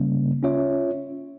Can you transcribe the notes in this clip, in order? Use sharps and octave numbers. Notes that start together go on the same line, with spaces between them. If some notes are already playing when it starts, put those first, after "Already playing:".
Already playing: C#3 G3 A#3 C#4
C#4 F4 C#5 E5